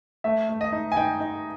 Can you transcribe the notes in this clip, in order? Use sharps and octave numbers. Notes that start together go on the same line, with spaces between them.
A3 E5
A3
D#5
D#4
G#5
D#4 G5
D#4